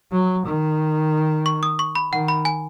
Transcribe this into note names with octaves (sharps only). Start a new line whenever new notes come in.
F#3
D#3
C#6
D#6
C#6
B5
D#3 F#5
B5
G#5